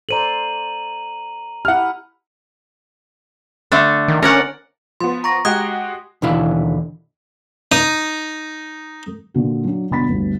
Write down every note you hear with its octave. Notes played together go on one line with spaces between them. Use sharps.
A4 C5 D5 A#5 D#7 F#7
E4 G4 F#5 F6
D3 A3 D4
D#3
C#4 A#4 D5 F#5
F3 B3 C6
A#5 C#6 A#6
G#3 F#4 G4 D#6 F#6 G#6
D#2 B2 D3 E3 E4 F5
D#4 D#6
A#2 D3 F#4
F#3 D4
G1 B2 D4 B5 A6 B6
G1 D2 G2